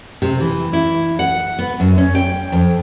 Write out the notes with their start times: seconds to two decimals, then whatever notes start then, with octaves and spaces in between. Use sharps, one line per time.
0.22 C3
0.40 E3
0.73 E4
1.19 F#5
1.59 B3
1.80 F#2
1.98 C#4
2.15 G5
2.52 F2